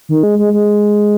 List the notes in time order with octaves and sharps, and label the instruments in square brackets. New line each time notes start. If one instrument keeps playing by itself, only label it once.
[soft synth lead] D#3
G#3
G#3
G#3